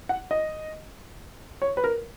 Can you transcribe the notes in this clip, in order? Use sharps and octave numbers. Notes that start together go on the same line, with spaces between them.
F#5
D#5
C#5
B4
A#4